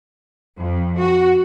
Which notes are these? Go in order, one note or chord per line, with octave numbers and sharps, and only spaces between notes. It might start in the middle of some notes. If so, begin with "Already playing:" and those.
F2
F#4